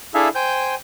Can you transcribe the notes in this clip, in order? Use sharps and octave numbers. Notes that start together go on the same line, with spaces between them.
D4 E4 G#4 A4 E5 F5
C5 G5 G#5 G6